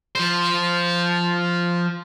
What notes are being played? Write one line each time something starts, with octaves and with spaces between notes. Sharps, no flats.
F3 C5